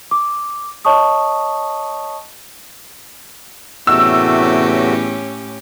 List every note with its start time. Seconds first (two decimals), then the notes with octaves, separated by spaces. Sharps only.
0.11 D6
0.85 C#5 D#5 A5 C#6 D#6
3.87 E2 A2 C3 A3 C#4 F#4 G4 E6